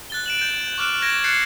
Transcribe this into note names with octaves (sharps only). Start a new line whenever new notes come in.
F#6 A6 G7
D7 E7 F#7
G6 D7
C#6 D6 F6 F#6 D7
G#6 A#6 D7 E7 F#7 G7
F#6 G6 A6 C7 C#7